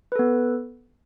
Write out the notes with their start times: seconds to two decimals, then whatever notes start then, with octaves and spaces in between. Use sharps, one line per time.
0.12 B4
0.16 A4
0.19 B3